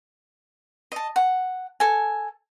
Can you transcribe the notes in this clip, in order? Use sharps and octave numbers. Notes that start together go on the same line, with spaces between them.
D#5 A5
F#5
A4 G#5